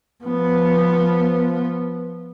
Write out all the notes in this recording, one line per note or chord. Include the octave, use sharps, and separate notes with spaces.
F3 B3